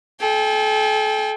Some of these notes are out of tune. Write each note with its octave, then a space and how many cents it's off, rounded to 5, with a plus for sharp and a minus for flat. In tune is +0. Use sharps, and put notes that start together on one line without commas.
A4 -40 G5 +25